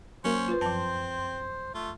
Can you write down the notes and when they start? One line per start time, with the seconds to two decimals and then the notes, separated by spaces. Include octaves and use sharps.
0.24 F#3 A#3 C#4 C5
0.48 F4 B4
0.61 F#2 F3 C4 A5
1.74 A3 F4